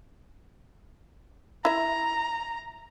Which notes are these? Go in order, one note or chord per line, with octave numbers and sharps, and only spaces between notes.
E4 E5 A#5